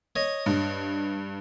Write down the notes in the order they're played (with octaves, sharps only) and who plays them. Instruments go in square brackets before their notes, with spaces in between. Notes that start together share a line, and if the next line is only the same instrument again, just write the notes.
[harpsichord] C#5 D#5
[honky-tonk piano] G2